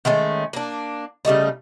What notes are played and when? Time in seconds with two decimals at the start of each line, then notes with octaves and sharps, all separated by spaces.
0.05 D#3 G#3 A3 C#4
0.53 A#3 D4
1.25 C#3 G3 A3 D#4